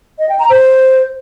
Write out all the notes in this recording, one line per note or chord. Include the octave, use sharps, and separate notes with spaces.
D#5
G5
A#5
C5